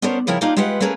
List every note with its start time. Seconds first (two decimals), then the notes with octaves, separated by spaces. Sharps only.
0.02 B3 C#4 D4 A#4 C5
0.27 C#3 F3 E4 A#4 C#5 G5
0.41 A#3 D4 D#4 F4 G4 A#4
0.57 G#3 F4 G4 B4 F#5
0.80 A3 A#3 C#4 G#4 A#4 B4